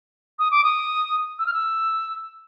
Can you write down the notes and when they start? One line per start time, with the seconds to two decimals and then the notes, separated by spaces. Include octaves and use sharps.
0.39 D#6
0.51 D6
0.64 D#6
1.39 E6
1.46 F6
1.53 E6